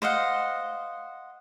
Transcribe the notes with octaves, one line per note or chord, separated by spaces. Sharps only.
C5 D#5 F5 F#5